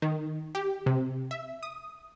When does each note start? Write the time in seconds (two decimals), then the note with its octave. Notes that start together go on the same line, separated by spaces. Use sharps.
0.02 D#3
0.55 G4
0.86 C3
1.31 E5
1.63 D#6